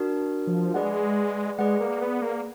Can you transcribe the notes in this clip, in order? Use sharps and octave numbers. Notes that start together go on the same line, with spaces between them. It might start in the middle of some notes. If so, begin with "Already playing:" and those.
Already playing: D4 F#4 A#4
F3
G#3 G#4 B4 D5 F#5
G#3 G#4 B4 D5 F#5
A#3
B3
A#3